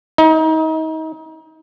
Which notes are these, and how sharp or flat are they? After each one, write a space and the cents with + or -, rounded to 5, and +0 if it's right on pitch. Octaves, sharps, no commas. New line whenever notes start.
D#4 +35